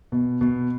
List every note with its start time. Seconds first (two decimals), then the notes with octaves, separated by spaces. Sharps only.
0.12 B2
0.41 B2